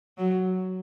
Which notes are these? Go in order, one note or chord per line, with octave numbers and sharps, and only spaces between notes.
F#3